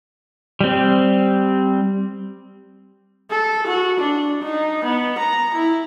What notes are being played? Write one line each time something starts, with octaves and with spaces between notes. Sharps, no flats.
G3 C4
A4
F#4
D4
D#4
B3
A#5
E4